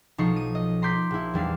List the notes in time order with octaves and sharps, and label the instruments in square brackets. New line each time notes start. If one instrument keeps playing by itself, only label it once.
[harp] B1 F3 D#4 C#6 C7
D#7
D#5
A#5 C6 D6 G6 B6
A#1 E4
E2 G3 D4 F5